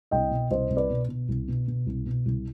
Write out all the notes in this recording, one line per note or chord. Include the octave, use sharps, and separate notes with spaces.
C2 D#5 G5
B2
C2 C5 D#5
C2
B4 D5
B2
B2
C2
B2
B2
C2
B2
C2